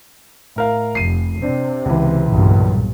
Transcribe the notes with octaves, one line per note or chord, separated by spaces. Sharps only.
A2 A#4 F5
F1 C7 D#7
C3 C4 D4
C#2 E3
B1 G2 A#2